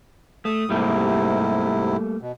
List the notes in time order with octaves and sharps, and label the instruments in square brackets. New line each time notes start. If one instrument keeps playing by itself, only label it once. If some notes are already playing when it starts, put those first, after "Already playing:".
[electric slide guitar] A3 [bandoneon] D#6
[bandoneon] G#2 C3 E4 [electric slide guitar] G3 A3 A#3
[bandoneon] B2